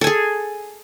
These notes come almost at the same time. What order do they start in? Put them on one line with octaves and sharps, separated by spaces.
A4 G#5 G#4